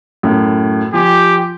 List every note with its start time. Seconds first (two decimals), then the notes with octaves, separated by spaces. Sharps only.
0.23 F#2 A2
0.93 F3 G4 G#5